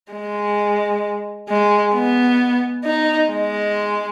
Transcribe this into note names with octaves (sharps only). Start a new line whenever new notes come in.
G#3
G#3
B3
D#4
G#3